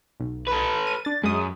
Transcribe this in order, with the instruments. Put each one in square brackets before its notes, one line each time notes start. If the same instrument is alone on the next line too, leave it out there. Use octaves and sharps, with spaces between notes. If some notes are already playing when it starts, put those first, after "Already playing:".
[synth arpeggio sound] B1
[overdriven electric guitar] A4 B4
[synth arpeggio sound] D#7
D4 A6
[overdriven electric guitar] F#2 [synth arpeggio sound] G#3 D#6